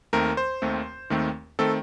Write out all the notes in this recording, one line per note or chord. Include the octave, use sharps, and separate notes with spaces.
D#2 D#3 A3 C4 A#4
C5
D#2 D#3 A3 C4
D#2 D#3 A3 C4
D#3 A3 C4 A4